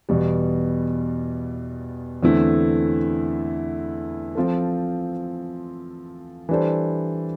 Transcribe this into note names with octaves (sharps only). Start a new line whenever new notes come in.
E2 B2 G3
E2 D3 A3 C4 E4
F3 C4 F4 A4
E3 G3 D4 A4 C5